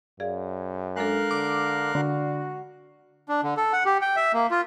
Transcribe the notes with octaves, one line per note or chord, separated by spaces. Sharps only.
F#2 G#4 D5 F5
G#3 D4 A4 A#4 F5 F#6
D3 D6
D3 F#4
D4
D3
A4
F#5
G4
G5
E5
A#3
F4